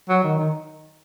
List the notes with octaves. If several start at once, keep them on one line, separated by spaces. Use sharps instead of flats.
F#3
D#3
D#3